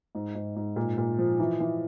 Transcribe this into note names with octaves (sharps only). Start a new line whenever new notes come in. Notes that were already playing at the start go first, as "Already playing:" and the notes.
G#2
G#2
G#2
A#2
A#2
F3
E3
E3